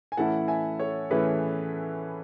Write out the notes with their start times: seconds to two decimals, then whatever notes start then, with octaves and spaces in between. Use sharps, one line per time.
0.12 G#5
0.17 A2 E3 A3 C#4 E4 F#5 A5
0.48 E5 G#5
0.80 A4 C#5
1.10 A2 E3 A3 C#4 E4 G#4 B4